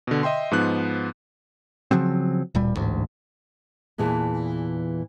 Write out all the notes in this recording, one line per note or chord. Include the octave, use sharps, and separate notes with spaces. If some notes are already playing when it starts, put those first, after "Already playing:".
B2 D3
D#5 E5 G5 C6
G#2 F3 B3 F#6
C#3 F3 F#3 C4
D1 A#2 G3
A1 D2 G#2
E2 A#2 E3 G#4 A5